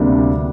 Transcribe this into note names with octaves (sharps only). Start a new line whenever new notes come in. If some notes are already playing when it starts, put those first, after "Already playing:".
Already playing: D2 C3 G3 A#3 D4